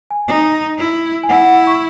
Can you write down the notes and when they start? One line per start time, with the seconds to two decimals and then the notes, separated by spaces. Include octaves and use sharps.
0.11 G#5
0.28 D#4
0.78 E4
1.23 G#5
1.29 E4 F#5
1.41 F#5
1.67 C#6